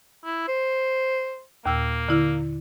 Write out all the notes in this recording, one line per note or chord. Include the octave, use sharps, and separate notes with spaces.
E4
C5
D#2 A#2 A#3 E6
D3 E4 F6